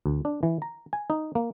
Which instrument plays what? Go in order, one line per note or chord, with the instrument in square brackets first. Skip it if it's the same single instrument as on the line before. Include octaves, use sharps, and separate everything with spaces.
[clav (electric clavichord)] D2
D4
E3
A#5
G#5
D#4
A#3